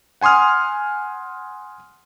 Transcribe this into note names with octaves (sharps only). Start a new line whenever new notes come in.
F#5 G#5 C6 D#6 F6